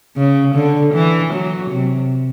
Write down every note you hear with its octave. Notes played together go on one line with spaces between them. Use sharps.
C#3
D3
E3
F#3
C3